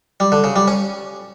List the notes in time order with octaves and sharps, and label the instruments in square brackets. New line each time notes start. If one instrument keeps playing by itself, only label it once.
[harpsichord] G3
D3
C#3
G3
C#4